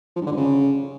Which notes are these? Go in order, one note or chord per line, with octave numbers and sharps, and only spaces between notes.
F3
G2
D3
G2
C#3